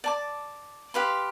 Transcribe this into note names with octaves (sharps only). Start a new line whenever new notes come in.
D5 A5 D6
G4 B4 F5 C6